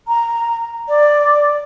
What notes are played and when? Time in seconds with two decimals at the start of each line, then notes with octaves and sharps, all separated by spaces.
0.08 A#5
0.89 D5